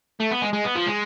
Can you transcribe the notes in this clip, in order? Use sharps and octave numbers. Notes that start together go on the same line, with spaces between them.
A3
B3
G#3
G#3
B3
F3
G#3